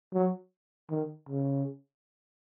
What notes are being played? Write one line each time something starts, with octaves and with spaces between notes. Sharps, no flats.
F#3
D#3
C#3